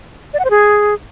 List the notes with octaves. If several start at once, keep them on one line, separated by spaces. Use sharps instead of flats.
D5
F#5
C5
G#4